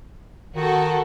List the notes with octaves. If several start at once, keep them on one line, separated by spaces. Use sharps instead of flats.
D#3 F#4 A4